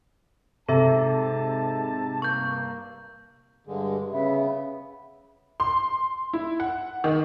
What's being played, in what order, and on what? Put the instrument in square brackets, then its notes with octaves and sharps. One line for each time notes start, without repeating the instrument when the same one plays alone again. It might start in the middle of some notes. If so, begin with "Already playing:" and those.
[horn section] G#2 A5 [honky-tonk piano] C3 [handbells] A4 E5
[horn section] G2 A#3 [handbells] C#6 G6
[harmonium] G2 D3 G#3
[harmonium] C#3 B3 [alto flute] E5
[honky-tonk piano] C6
E4
F#5
D#3